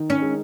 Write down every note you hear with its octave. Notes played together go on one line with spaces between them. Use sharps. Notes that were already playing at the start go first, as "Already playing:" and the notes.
Already playing: D#3 D#4
C#4
G#3